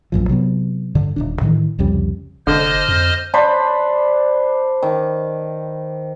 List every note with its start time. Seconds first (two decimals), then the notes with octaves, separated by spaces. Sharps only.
0.12 A#1 F#2 A#2 F3
0.29 C3 F#3 B3
0.95 G2 D3
1.16 D#1 G#1 D4
1.41 A2 D#3 E3
1.79 C2 F2 C#3 G3
2.47 F1 D3 C5 D#5 F6
2.88 F2
3.34 D4 C5 B5
4.82 D#3